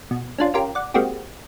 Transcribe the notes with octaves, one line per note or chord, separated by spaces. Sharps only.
B2
C#4 D4 F4
C#4 F4 G4 A#4
D5 F#5
G#3 A#3 C4 F#4 G4